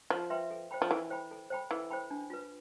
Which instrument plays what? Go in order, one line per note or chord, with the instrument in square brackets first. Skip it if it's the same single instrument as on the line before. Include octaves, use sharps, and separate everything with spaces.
[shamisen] F3 [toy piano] F4
[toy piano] B4 E5 G5 C6
A4
C5 G5 B5
[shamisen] F3
[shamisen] E3 [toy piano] A4
[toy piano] C5 G5 B5
A4
C5 G5 B5
[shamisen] E3 [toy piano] A4
[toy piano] C5 G5 B5
D4
F4 B4